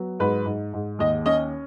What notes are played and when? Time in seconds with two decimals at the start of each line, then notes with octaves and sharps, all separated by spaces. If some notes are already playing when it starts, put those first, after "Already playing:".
Already playing: F#3 B3
0.20 G#2 B4
0.46 G#2
0.73 G#2
0.99 D#2 D#5
1.26 C#4 D#5